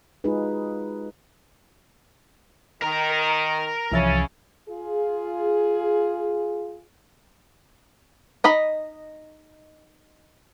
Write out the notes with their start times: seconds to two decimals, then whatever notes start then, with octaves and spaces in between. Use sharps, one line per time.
0.24 G#3 D#4 F4 F#4 G#4 B4
2.82 D#3 A#4 A#5
3.92 C2 C#3 E3 F3 C#4 E5 A6
4.70 F4 G#4
8.44 D#4 D#5 B5